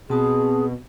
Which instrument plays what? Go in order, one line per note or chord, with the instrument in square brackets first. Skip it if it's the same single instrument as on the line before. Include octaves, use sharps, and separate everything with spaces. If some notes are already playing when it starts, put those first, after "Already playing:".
[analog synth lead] B2 [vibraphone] C4 A5 D#6 [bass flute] G#4